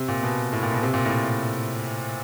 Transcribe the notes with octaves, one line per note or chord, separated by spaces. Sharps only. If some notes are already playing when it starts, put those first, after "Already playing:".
Already playing: C3
A#2
B2
A2
A#2
B2
C3
A#2
A2